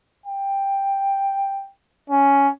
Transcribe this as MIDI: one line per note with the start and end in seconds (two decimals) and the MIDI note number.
0.26 1.68 79
2.10 2.49 61